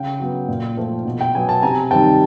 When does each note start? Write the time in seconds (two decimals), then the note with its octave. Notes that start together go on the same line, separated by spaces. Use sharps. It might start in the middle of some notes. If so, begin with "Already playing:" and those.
Already playing: C#3 F5 G5
0.20 F#3 B3
0.48 A#2
0.77 F3 A3
1.05 B2
1.21 G5
1.34 F#3 B3 G#5
1.49 A5
1.63 C3 G#5 A#5
1.91 D#3 G3 C4 G5 A5